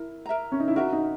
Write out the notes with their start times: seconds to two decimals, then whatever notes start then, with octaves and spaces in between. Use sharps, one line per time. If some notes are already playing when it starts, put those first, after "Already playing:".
Already playing: E4 A#4
0.26 A#4 E5 A#5
0.52 C#4
0.60 D#4
0.68 E4
0.76 F#4 A#4 E5 A#5
0.93 D#4